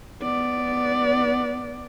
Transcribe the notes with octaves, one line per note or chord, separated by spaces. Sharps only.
B3 D5